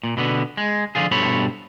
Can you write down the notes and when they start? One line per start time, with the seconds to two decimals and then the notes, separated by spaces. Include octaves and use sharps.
0.03 A#2
0.17 B2 D3 B3
0.57 G#3
0.95 D3 F3 F4 G#4
1.11 G2 B2 A4 C5 C#5 B5